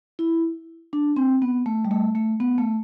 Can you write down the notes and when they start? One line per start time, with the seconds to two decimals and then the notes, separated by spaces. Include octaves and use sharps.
0.19 E4
0.93 D4
1.16 C4
1.42 B3
1.66 A3
1.85 G3
1.91 A3
2.15 A3
2.40 B3
2.58 A3